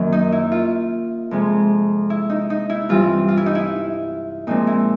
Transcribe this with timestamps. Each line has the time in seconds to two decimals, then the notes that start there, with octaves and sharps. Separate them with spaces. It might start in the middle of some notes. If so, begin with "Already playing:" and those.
Already playing: F#2 D#3 F#3 A#3 C#4
0.12 D#4
0.32 E4
0.52 F4
1.31 F2 C3 F3 G#3
2.10 E4
2.30 D#4
2.50 D#4
2.70 E4
2.89 G2 E3 G3 C4 F4
3.28 F4
3.37 E4
3.46 D#4
3.55 E4
4.47 A#2 F3 G#3 C4 D#4
4.67 E4